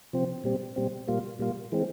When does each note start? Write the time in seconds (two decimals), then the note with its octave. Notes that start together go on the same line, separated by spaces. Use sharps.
0.13 C3 F3 C4
0.44 A#2 G3 C4
0.76 A#2 G3 C4
1.07 A#2 G3 A#3 F4
1.39 A#2 G3 A#3 F4
1.72 E3 G#3 C4